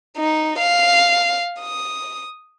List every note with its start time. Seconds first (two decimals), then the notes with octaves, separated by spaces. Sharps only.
0.17 D#4
0.58 F5
1.61 D#6